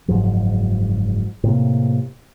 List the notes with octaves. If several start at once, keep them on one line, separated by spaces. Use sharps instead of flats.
F#1 G#2 F3 F#3
A2 C3 A#3